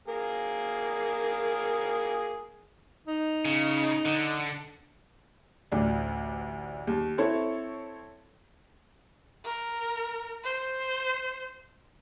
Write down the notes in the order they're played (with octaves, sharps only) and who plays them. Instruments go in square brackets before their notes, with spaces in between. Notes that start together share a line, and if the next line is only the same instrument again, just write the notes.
[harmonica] A#3 G#4 A#4
[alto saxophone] D#4
[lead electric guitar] C#3
D3
[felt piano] A1 D2 D4
D#2
C4 E4 A4 C#5
[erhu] A#4
C5